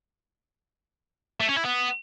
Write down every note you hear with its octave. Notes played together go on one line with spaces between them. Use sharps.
A3
C#4
E4
B3